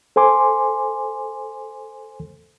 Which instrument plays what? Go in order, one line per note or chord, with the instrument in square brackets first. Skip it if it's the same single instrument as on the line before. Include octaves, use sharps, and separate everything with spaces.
[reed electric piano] A4 C5 G#5 C6 D6